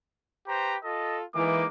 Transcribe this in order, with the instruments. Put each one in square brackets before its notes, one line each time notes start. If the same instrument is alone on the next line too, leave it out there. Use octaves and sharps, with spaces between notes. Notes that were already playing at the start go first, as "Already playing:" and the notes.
[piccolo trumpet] G4 [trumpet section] B4 C5 A#5
[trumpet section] F4 A4 [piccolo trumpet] D#5
[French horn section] E3 [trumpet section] G#3 A#3 D#4 [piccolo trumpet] D6